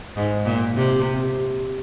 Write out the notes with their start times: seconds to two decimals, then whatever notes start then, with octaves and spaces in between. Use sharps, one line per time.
0.17 G#2
0.46 A#2
0.77 C3